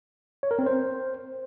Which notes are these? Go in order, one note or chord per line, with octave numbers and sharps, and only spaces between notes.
C#5
A#4
C4
C5